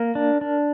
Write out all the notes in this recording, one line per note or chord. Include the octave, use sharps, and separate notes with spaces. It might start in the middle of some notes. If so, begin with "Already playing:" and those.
Already playing: A#3 A#4
D4
D4